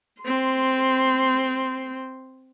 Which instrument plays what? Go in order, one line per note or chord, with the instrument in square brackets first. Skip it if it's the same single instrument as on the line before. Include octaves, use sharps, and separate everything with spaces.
[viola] C4 C6